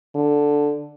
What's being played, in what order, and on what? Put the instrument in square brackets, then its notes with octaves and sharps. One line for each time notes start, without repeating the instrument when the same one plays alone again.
[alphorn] D3